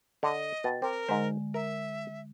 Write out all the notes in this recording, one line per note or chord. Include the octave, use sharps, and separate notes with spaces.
D3 D#5
B2 G5 A6
C4 A#4 D6
G#2 D3 G#3 C5
A#4 E5